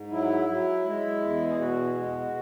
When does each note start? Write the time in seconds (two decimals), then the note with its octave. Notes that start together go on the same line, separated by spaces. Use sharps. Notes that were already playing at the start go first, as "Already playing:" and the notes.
Already playing: G#2
0.11 F#3 E4
0.48 F#3
0.85 G#3
1.21 E2
1.50 G#4
1.59 B2 F#4
1.95 G#3